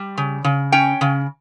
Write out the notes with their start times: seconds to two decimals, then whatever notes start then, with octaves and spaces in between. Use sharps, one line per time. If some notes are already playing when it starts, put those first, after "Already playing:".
Already playing: G3
0.17 C#3
0.44 C#3
0.72 C#4 G5
1.01 C#3